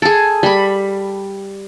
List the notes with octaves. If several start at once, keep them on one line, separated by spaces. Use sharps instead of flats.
G#4 A4
G3 B5